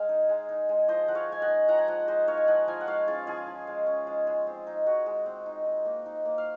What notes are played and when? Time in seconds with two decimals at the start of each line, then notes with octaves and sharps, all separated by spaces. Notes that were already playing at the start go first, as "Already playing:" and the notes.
Already playing: G#3 F5 G#5
0.09 D#4
0.29 G#3
0.49 D#4
0.69 G#3
0.88 F3 C5 D#5
1.08 F3 F#5
1.15 C#5 F5
1.28 G#3 G#5
1.42 D#5 F#5
1.48 D#4
1.68 F3 F#5 A#5
1.78 G#5
1.88 F3 D#5 F#5
2.08 G#3 C5 D#5
2.27 D#4 C#5 F5
2.38 G#5
2.47 F3 D#5 F#5
2.67 F3 F5 G#5
2.81 F#5
2.87 G#3 C#5 F5
3.07 C#4 F4 G#4
3.27 F3 F4 G#4
3.47 F3
3.67 G#3
3.87 C#4
4.07 G#3
4.27 G#3
4.47 C4
4.67 D#4
4.86 G#3 F#4
5.06 G#3
5.26 C4
5.46 D#4
5.65 D#4
5.85 A#3
6.06 D#4
6.25 A#3
6.38 F5